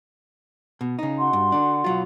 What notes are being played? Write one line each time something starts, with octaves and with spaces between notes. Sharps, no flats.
B2
C#3 D#4
F#4 F#5 C6
G2
D3 D4
B1 F#3 F4